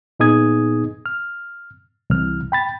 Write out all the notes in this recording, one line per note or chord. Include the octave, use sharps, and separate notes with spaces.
A#2 B3 D#4 G#4 D#6 G#6
F6
C2 E3 F6
G5 B5 A6